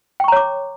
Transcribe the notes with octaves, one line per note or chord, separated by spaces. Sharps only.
C#5 G5 A#5 C#6 D6